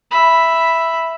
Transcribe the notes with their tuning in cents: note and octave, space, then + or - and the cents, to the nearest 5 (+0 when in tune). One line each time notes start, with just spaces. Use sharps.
E5 +0 B5 +0